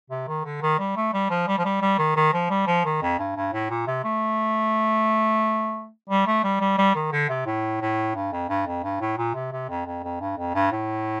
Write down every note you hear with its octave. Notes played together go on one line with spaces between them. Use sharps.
C3
D#3
D3
D#3
G3
A3
G3
F3
G3
F3
G3
G3
D#3
D#3
F3
G3
F3
D#3
F2
G2
G2
A2
A#2
C3
A3
G3
A3
G3
G3
G3
D#3
D3
C3
A2
A2
G2
F2
G2
F2
G2
A2
A#2
C3
C3
F2
F2
F2
G2
F2
G2
A2